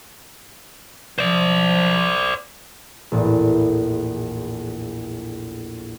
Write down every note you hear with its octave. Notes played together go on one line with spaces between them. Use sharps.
F3 C5 D5
A#1 E2 A2